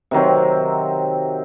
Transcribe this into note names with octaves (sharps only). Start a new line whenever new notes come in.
C3 D#3 F#3 C4